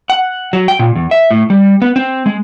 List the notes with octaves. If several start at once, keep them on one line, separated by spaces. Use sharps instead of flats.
F#5
F#3
G5
A#2
E2
E5
A2
G3
B3
C4
G#3